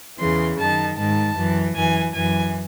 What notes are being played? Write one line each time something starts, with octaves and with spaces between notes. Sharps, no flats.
E2 C#3 E3 C6
F#2 D#3 A5
G#2 D#3 A5
F#2 E3
F#2 E3 G#5
F#2 E3 G#5